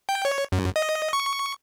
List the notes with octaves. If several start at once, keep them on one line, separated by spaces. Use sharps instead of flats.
G5
C#5
F#2
D#5
C#6